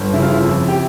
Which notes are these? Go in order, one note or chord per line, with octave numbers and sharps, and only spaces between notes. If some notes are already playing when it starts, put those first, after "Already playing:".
Already playing: G1
C#3 E4
F4
E4
F2
G4